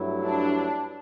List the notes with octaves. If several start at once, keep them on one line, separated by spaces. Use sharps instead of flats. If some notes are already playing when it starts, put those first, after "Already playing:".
Already playing: G2 F#3 A3 E4
D4